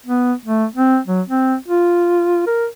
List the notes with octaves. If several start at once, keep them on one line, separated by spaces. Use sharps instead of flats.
B3
A3
C4
F#3
C4
F4
A#4